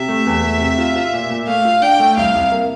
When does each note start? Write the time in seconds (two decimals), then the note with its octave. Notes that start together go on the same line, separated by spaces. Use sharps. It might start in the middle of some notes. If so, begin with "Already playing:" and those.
Already playing: C3 E5
0.08 A3
0.26 E2
0.44 A3
0.61 C3
0.78 F4
0.96 F4
1.13 A#2
1.30 A#2
1.47 A3 F5
1.65 F4
1.82 D4 G5
1.99 A3
2.17 C2 F5
2.35 C2
2.52 A#3